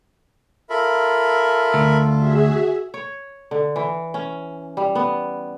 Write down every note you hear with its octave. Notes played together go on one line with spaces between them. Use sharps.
F4 A4 A#4 E5 B5
D2
F#4 G#4 E5
C#5
D3
E3
C#4
G3
B3